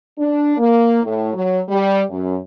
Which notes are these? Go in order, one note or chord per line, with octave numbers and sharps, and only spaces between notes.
D4
A#3
A2
F#3
G3
F#2